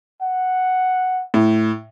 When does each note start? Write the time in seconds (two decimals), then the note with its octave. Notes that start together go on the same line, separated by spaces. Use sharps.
0.22 F#5
1.34 A2